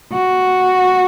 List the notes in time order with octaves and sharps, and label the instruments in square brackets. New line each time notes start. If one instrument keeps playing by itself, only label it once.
[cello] F#4